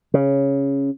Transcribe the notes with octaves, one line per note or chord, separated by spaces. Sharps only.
C#3